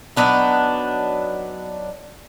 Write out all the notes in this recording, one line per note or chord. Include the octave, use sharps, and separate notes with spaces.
F#3 B3 D4 D#4